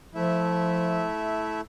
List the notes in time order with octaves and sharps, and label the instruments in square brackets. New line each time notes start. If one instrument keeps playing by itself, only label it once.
[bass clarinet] F3 [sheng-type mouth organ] A3 E4 E5